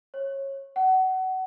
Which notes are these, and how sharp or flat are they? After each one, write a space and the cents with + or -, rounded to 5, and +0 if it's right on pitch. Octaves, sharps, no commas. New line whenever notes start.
C#5 -20
F#5 +25